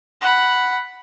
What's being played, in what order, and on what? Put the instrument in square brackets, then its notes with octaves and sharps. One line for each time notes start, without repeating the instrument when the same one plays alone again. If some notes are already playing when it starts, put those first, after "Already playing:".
[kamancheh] F#5 B5